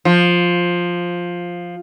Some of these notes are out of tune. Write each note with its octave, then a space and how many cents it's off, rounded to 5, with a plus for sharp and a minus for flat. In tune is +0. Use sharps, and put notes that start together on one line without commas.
F3 +5